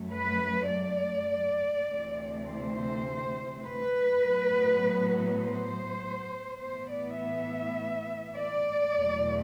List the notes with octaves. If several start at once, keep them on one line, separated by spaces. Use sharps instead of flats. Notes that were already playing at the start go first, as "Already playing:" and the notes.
Already playing: F#2 F#3 A3
B4
D5
D2 C3 E3 A3 C4
C5
B4
A2 F#3 B3
C5
A2 E3 B3 C5
D5
E5
D5
E2 B2 F#3 A3